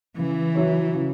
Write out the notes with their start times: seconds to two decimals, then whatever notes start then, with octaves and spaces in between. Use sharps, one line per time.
0.18 C#3 E3
0.55 F#3 E4 C#5
0.94 C#3